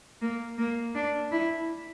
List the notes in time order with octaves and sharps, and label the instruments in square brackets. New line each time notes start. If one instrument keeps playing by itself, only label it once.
[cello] A#3
A#3
D4
E4